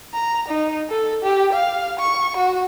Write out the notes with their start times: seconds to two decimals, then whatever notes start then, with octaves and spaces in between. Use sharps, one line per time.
0.14 A#5
0.48 D#4
0.90 A4
1.23 G4
1.53 F5
2.00 C#6
2.37 F#4